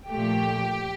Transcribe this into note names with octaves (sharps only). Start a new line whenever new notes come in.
A#2 F3 A3 G4